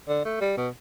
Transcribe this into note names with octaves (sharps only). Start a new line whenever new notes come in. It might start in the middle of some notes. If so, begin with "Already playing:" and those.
D3
A3
G3
B2